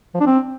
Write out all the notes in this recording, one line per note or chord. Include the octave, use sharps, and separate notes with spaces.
F3
D4
C4